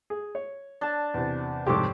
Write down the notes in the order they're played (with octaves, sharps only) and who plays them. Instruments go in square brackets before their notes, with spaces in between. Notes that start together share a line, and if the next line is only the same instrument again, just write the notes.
[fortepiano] G#4
C#5
[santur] D4 A5
[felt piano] E2 C3
[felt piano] C2 F2 G#2 [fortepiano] G4 A4 [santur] C5 C#5 D6